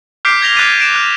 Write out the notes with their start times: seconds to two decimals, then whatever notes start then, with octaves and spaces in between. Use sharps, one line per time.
0.25 D6 F6 G6 B6 C7 D7
0.41 G6 G#6 A#6 F7 G7
0.56 D6 F#6 G#6 A6 B6 D#7
0.79 C7 D7 E7
0.95 F#6